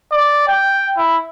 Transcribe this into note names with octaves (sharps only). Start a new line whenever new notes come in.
D5
G5
E4